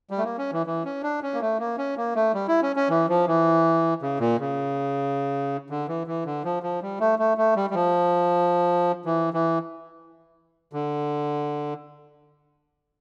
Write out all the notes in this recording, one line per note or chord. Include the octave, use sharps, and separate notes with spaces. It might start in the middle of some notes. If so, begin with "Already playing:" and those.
G3
A3
A#3
C#4
E3
E3
C#4
D4
C#4
A#3
A3
A#3
C#4
A#3
A3
G3
E4
C#4
C#4
E3
F3
E3
C#3
A#2
C#3
D3
E3
E3
D3
F3
F3
G3
A3
A3
A3
G3
G3
F3
E3
E3
D3